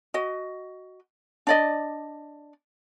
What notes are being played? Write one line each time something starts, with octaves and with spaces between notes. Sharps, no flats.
F#4 D#5
D4 D5 D#5